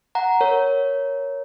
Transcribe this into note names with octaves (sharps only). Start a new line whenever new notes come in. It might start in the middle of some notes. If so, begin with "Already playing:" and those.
F#5 A#5
A#4 C#5